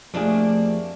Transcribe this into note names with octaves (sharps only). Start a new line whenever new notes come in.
F2 F3 A3 A#3 D4 G4 G#4